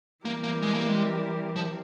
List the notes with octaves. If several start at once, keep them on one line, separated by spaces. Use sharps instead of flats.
E3 G3 A#3 C4 G4 A#4
A#3
G#3
A#3
G#3
F3